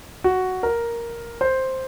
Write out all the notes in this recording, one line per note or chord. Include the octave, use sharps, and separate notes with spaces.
F#4
A#4
C5